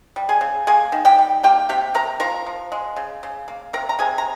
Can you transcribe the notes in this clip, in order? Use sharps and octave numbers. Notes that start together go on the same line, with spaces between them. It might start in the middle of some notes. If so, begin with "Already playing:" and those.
G3
G#4 G#5
C#3
A#3 G#4 G#5
D#3
G4 G5
G3
A#3 G4 G5
C3 G4 G5
C3 A#4 A#5
F3 A#4 A#5
F3
G#3
C#3
C#3
A#3
C3 A#4 A#5
A#5
C3 G#4 G#5
A#5